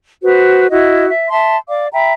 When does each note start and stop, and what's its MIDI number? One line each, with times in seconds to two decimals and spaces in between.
0.23 0.67 66
0.23 0.67 71
0.23 0.67 72
0.70 1.08 64
0.70 1.08 66
0.70 1.08 75
1.08 1.29 76
1.30 1.56 76
1.30 1.56 81
1.30 1.56 84
1.69 1.87 74
1.69 1.87 77
1.69 1.87 86
1.93 2.13 76
1.93 2.13 79
1.93 2.13 82
1.93 2.13 83